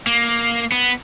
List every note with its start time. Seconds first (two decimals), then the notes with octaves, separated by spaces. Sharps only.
0.07 A#3
0.72 B3